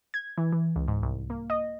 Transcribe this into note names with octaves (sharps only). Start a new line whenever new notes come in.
G#6
E3
E3
C#2
G#2
C2
A#3
D#5